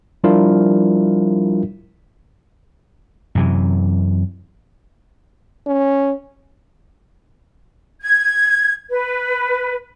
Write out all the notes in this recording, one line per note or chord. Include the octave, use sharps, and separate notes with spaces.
F3 G3 D4 E4 F4 A#4
F#2 C3 E3
C#4
G#6
B4